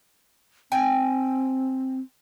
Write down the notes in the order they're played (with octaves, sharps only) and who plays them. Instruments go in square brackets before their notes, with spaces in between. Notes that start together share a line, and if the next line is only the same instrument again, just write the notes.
[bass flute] C4 [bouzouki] G5 G#5